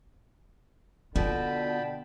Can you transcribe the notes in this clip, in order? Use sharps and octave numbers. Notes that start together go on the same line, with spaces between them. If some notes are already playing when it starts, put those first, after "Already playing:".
B2 D3 F4 G5 A5 B5